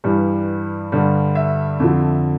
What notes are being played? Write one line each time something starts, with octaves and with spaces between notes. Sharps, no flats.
G2 E3 G3
G2 D3 G3
E5
F2 D3 F3